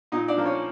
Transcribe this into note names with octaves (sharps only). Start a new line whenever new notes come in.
A#2 D#4 D#5
D4 D5
F3 A#3
C#4 C#5